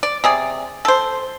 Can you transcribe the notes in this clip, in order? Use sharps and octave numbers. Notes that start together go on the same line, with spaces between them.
D5
C3 G#4 D5
A4 C5